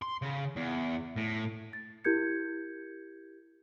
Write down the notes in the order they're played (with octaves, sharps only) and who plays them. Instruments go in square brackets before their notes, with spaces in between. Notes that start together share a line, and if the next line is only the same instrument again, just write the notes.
[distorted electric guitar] C6
C#3
E2
A2
[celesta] A6
E4 G4 A#4 G6 G#6 C#7